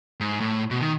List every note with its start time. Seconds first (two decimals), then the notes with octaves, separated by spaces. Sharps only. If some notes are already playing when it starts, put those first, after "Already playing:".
0.20 G#2
0.40 A2
0.71 B2
0.81 D#3